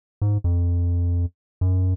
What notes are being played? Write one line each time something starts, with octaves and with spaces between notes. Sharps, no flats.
G#2
F2
F#2